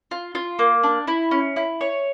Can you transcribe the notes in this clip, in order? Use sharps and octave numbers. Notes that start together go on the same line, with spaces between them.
F4
F4
A#3
D4
E4
C#4
E4
C#5